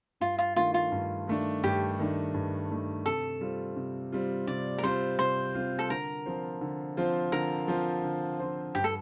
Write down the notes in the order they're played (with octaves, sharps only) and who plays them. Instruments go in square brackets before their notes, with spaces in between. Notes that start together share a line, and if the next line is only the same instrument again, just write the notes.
[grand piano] G2 [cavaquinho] F4
[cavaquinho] F4
[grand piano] D#3 A3 D4 [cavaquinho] F4
[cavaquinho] F4
[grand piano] G2
D#3 A3 D4
[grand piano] G2 [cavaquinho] G4
[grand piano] D#3 A3 D4
G2
D#3 A3 D4
[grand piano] C3 [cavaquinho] A4
[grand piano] G3 C4 F4
C3
G3 C4 F4
[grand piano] C3 [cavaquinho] D5
[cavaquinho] A#4
[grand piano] G3 C4 F4 [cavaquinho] C5
[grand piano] C3 [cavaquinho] C5
[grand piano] G3 C4 F4
[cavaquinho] A4
[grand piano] D3 [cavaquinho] A#4
[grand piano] F3 C4 F4 C5
D3
F3 C4 F4 C5
[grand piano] D3 [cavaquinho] A#4
[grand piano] F3 C4 F4 C5
D3
F3 C4 F4 C5
[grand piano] G2 [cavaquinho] G4
[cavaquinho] A4